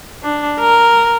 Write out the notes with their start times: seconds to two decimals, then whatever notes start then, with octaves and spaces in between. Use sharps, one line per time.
0.23 D4
0.59 A#4